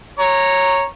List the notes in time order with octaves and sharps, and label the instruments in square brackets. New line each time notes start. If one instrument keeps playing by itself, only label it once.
[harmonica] C#5 A#5